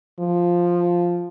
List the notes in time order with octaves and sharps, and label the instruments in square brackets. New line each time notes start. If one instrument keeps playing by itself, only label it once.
[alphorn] F3